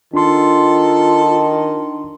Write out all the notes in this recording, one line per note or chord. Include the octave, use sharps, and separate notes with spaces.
D#3 D4 F4 A4 C6